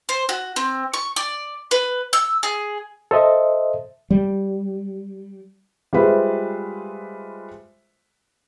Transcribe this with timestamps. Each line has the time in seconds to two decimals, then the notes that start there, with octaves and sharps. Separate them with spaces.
0.09 C5
0.29 F#4
0.56 C4
0.94 C#6
1.16 D5
1.71 B4
2.13 E6
2.43 G#4
3.11 A4 C5 D#5 E5
4.11 G3
5.93 G3 G#3 F4 B4 C5 E5